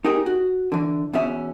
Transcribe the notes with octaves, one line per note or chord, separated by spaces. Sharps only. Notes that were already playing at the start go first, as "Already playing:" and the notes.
D#4 G4 G#4 A#4 G5
F#4
D3 E3
E2 B2 E3 C#4 E5